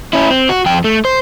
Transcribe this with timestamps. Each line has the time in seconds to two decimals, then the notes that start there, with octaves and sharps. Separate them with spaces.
0.13 C#4 E4
0.31 C4
0.49 F#4
0.66 F2 G5
0.84 A3
1.05 C5